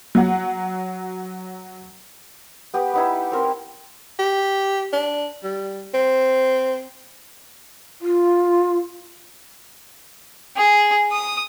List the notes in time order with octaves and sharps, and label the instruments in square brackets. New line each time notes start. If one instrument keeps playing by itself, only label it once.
[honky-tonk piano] F#3 F#5
[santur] B3 G4 B4 D#6
B3 D#4 E4
C4 A#4 C6
[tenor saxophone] G4
D4
G3
C4
[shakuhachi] F4
[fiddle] G#4
D#6